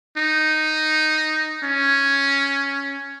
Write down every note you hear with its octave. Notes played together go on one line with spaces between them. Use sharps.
D#4
C#4